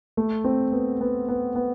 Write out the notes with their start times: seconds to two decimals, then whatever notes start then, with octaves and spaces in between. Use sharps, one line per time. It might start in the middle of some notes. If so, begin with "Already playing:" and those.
0.17 A3
0.44 C4
0.72 B3
1.01 B3
1.28 B3
1.55 B3